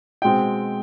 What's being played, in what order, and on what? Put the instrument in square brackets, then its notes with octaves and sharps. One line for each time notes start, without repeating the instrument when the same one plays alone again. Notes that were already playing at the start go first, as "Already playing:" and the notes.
[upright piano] B2 G#3 C4 G5